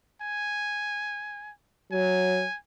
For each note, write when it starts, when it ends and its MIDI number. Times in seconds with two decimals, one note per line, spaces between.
0.22 1.52 80
1.92 2.45 54
1.92 2.56 80